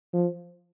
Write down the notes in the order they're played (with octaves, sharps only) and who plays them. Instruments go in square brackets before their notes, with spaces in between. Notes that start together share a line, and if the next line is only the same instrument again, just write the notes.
[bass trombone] F3